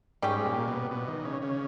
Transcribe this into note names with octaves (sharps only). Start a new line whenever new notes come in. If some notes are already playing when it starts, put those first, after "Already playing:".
G#2 G3 C#4 G4
A#2
B2
B2
D#3
C#3
C#3